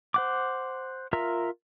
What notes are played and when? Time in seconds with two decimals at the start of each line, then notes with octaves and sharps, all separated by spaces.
0.14 C5 F#5 D6
1.13 F4 A#4 E5 A#5